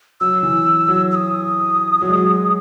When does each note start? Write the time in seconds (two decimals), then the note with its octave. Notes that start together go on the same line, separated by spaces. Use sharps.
0.20 F#3 E6
0.43 E3
0.89 F#3
1.11 E6
1.15 D#6
2.02 F#3
2.09 G#3
2.16 F#3